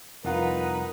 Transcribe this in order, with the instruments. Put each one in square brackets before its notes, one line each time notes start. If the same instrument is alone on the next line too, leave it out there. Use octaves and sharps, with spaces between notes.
[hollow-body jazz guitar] C2 F4 [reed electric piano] F2 F#5 [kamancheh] D#4 B4 [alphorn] A#4